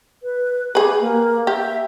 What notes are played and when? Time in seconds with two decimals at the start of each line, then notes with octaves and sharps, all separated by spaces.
0.23 B4
0.75 G4 G#4 B4
1.01 A#3
1.47 G4 E5